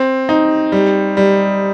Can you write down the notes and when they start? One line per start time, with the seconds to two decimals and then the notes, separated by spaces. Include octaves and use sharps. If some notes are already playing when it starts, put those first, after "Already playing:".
Already playing: C4
0.29 D#4
0.72 G3
1.17 G3